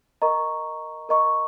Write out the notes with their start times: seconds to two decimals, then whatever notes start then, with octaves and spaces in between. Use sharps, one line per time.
0.22 A#4 D#5 A#5 C#6
1.09 A#4 D#5 A#5 C#6